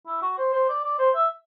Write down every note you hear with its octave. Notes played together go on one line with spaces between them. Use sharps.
E4
F#4
C5
C5
D5
D5
C5
E5